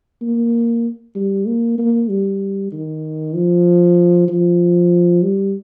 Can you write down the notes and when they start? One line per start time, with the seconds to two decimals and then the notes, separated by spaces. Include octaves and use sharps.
0.22 A#3
1.15 G3
1.47 A#3
1.78 A#3
2.10 G3
2.72 D#3
3.35 F3
4.28 F3
5.22 G3